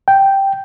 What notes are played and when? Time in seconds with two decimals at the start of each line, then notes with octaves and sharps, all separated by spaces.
0.08 G5